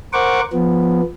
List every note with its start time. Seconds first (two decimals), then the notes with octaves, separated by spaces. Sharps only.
0.13 A#4 C5 F#5 C#6 D6
0.53 F3 B3